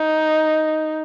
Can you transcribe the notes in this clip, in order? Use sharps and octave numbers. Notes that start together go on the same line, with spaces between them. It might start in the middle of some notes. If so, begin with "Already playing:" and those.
Already playing: D#4